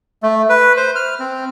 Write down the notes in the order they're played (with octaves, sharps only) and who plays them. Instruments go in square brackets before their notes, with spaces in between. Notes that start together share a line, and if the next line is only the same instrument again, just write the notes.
[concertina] A3
B4
C5
F6
C4